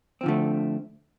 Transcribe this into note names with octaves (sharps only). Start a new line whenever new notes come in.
D3 F3 A3 C4